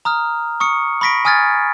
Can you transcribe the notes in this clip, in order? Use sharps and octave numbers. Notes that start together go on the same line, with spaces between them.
A#5 D#6 F6
C#6 D#6 C#7
B5 C#6 A#6 B6 D7
G#5 D#6 F6 G#6 A6